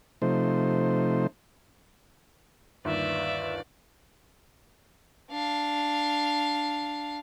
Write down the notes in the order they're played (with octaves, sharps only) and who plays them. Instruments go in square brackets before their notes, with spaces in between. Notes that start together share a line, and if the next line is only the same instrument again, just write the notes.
[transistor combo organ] C3 F3 A3 D#4 C5
[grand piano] G1 D#2 [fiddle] B4 D5 [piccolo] E5
[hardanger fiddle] D4 F5